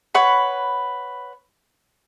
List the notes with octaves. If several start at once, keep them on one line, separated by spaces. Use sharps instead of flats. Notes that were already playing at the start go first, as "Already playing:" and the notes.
B4 C#5 F#5 B5